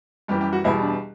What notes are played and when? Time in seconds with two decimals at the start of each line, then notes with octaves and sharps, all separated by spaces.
0.28 F#2 E3 G3 G4
0.41 G4
0.53 F#4
0.64 E2 B2 G3 E4
0.82 D4